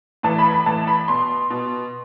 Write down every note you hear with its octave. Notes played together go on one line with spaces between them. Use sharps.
A2 E3 A5
B5
B5
A2 E3 A5
B5
B2 C6
B2